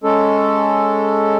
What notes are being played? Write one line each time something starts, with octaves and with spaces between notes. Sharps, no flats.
G#3 C#4 A4